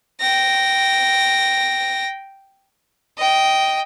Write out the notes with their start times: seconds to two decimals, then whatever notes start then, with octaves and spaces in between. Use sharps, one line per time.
0.21 G5 A#6
3.17 D#5 G5